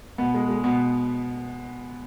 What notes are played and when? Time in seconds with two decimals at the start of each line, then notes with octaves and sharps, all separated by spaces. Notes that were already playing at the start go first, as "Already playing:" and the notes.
0.18 B2 B3
0.34 G#3
0.49 G#3
0.64 B2 B3